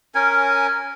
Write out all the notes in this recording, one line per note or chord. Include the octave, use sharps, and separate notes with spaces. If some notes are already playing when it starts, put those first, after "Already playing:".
C#4 A#4 G#5